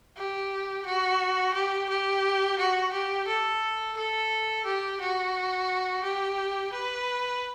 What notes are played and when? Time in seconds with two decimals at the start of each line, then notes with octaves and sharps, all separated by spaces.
0.17 G4
0.85 F#4
1.54 G4
1.89 G4
2.58 F#4
2.93 G4
3.27 A4
3.97 A4
4.65 G4
5.00 F#4
6.03 G4
6.73 B4